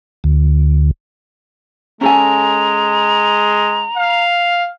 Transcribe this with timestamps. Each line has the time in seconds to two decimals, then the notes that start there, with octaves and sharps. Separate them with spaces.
0.24 D2
2.01 G#3 C#4 A4 G#5 A#5
3.97 F5